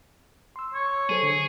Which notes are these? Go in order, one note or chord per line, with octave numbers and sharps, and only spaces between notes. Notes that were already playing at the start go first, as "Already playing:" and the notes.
C6 E6
C#5
F#3 G#4 A4 C5
D3